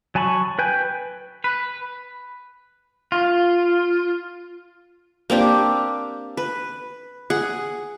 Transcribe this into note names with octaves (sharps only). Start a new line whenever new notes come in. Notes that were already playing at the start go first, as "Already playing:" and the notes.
F#3 G#5 A5 B5 C#6
B4 G5 G#5
B4
F4
A#3 C4 D4 G4
B4
G#4 F#5